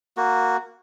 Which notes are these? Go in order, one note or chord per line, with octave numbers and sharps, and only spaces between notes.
A#3 F#4